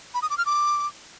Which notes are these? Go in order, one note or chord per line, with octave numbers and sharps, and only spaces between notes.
B5
D#6
D6
F6
D6